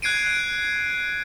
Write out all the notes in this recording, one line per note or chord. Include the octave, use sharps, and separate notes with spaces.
F#6 G#6 C7 D7 D#7